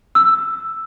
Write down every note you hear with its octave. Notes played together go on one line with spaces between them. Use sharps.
E6